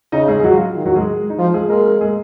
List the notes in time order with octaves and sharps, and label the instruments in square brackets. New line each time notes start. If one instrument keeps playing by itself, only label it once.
[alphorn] C#3 [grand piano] D#4 D#5
[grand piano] G#3 G#4
G#4
F#3 F#4
F4
[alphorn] D#3
[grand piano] F#3 F#4
G#3 G#4
D#4
[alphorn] F3 [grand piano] F4
[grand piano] G#3 G#4
[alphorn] G#3 [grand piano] A#3 A#4
[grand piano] A#3 A#4
G#3 G#4